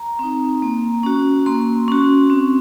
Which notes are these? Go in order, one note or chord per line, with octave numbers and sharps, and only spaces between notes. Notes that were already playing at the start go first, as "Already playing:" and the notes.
Already playing: A#5
C4 D#4
A#3
C#4 F#4
A#3 C6
C#4 F#4
C4